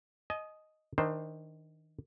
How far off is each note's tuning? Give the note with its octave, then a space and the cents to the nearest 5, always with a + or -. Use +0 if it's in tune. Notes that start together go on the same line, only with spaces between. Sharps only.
D#5 +0 G#5 +45
D#3 +20 D4 +30 C5 +0